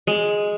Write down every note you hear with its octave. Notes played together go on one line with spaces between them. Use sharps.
G#3